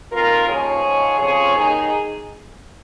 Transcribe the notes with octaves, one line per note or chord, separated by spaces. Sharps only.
F2 D#3 F4 A#4
D#2 C#3 F3 G#4 C#5
G#2 F3
F2 C#3 F3 G#4 C#5
D#2 D#3 D#4 G#4